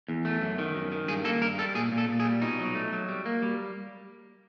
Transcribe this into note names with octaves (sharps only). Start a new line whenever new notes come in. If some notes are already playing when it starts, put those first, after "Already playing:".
E2
A3
F#2
D#3
F#2
D#3
G2 G#4
A#3 A4
G2 A#4
G3 A4
A#2 G#4
A#2
A4
A#2
G#4
G3
B2 D#4
F#3
A3
F#3
G3
A#3
G3